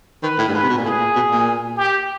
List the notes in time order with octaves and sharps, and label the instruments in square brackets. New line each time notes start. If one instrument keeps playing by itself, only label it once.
[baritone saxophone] D#3 [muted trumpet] B4
[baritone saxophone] A2
G2
[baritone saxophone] G#2 [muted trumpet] B4
[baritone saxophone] C3
B2
A#2
[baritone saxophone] A2 [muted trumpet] G#4
[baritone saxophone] A#2
B2
A#2
[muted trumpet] G4